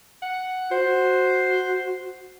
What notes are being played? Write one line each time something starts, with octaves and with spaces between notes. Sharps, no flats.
F#5
F#4 C5